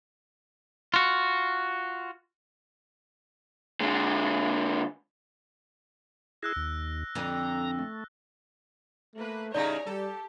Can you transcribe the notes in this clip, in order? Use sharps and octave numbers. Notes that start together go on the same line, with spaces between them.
F4 F#4
D3 G#3
E4 G#4 E6 F#6 A#6
D#2
F2 D3 A#5
A3
A3 A#3 B4
A2 C#3 G3 D#4 C#5 D5 G#5 A#5
G3 G4 A4